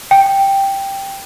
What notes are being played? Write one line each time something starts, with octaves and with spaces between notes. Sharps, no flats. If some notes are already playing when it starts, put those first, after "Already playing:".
G5